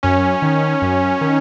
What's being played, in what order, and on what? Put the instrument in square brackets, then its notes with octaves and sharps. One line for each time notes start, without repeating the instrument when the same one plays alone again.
[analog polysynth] F#2 C#4
D#3
F#2
D#3